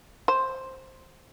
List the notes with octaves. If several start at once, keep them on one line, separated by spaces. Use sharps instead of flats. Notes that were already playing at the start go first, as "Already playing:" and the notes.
C5